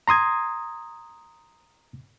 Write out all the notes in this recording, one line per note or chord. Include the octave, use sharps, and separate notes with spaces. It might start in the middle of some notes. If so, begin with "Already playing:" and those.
A#5 C6 D#6 G#6